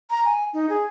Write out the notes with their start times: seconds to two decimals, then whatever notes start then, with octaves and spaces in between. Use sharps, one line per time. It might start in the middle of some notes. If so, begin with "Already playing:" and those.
0.10 A#5
0.25 G#5
0.53 D#4
0.69 G#4